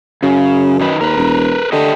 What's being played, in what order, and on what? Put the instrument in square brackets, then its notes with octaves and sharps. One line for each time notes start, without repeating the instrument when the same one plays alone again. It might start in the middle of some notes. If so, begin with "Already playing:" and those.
[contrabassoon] F#2 [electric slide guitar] C#3
[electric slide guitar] D#3 D#4 B4
[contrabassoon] D#2 [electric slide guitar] A#4 B4
[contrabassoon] E1
[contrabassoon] D3 [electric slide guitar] A3 G4 D#5